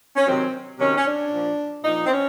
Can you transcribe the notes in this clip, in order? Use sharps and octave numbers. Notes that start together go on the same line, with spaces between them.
C#4
C3 D#3 F#3 C4
C3 D#3 F#3 C#4
C#4
D4
A#2 F3
A#2 F3 D#4
C4
C#4